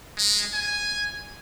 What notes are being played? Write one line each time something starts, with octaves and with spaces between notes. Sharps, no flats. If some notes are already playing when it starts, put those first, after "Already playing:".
G#3
G#5